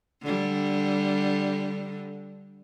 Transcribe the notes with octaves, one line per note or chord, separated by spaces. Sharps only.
D3 G3